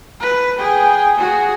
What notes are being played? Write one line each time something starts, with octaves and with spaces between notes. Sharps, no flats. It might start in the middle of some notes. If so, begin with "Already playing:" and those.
B4
G#4 G5
F#4 G#4